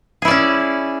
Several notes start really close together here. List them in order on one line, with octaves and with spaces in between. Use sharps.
G#4 E4 D5 C#4